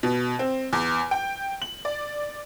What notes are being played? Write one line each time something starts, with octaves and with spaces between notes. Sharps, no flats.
B2
C4
E2
G5
F#7
D5